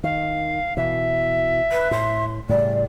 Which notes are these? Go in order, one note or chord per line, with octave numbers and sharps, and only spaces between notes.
D#3 F5
B2 E3 E5
B4
A2 C6
A2 C#3 G3 D5